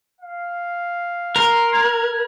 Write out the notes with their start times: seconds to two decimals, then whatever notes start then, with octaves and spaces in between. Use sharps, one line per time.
0.21 F5
1.36 A#4 C6
1.73 G#6